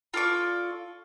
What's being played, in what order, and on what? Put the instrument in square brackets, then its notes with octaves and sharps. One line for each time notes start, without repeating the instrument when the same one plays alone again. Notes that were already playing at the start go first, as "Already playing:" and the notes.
[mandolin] F4 A4 D5 C#6